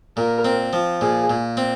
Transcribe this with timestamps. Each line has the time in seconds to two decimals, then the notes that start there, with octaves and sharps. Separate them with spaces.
0.17 A#2 A#4
0.45 C4
0.73 F3
1.01 A#2 G#4
1.30 A#2
1.57 C4